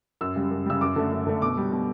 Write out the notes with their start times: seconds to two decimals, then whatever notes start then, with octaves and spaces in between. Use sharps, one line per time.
0.21 F#2 E6
0.36 C#3 G3
0.51 F#2
0.66 C#3 G3 E6
0.81 F#2 D6
0.96 D3 A3
1.11 F#2
1.27 D3 A3
1.42 B2 D6
1.57 G3
1.72 B2